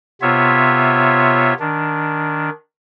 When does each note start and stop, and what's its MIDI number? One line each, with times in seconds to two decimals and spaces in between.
0.22 1.54 48
0.22 1.54 59
0.22 1.54 65
0.22 1.54 73
0.22 1.54 76
1.60 2.50 51
1.60 2.50 62